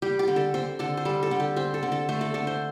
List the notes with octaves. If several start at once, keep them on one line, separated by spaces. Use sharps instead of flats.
G3 G4
G4
D3
A4
C4 C5
D3 A4
C5
G3 A4
A4
D3
G4
C4 C5
A4
D3
A4
A3 C5
A4
D3 A4
C5